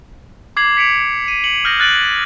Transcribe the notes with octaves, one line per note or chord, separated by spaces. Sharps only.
D6 G#6 C7 F#7
B6 C#7 D7 F7
D#7
C#7 F#7
D#6 F6 G6 A#6 F#7
F6 F#6 A6 D7 F#7